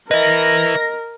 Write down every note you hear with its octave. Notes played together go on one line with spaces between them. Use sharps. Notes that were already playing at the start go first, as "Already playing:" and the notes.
A#4 B4 D#5 E5 A#6